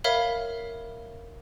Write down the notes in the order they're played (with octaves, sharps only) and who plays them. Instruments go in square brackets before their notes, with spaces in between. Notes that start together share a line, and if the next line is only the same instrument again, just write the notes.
[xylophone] A#4 C#5 E5 F5 B5